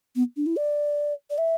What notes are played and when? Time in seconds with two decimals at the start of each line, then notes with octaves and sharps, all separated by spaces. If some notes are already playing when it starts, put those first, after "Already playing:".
0.16 B3
0.37 D4
0.46 E4
0.57 D5
1.30 D5
1.38 E5